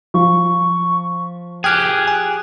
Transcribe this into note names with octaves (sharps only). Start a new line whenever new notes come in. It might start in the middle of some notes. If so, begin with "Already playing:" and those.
F3 C#6
G4 G#4 G5 F6 F#6
G#5